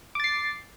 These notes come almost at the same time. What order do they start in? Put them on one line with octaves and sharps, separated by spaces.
D6 A6 C7